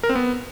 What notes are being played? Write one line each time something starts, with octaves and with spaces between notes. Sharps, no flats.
A#4
C4
B3